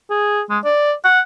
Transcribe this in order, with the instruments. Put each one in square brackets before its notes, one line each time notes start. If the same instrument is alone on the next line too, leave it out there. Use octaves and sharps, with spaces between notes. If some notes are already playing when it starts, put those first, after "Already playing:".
[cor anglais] G#4
G#3
D5
F#5